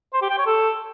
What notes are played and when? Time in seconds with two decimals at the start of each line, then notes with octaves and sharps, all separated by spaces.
0.14 C5
0.22 G4
0.30 G5
0.38 C#5
0.46 A4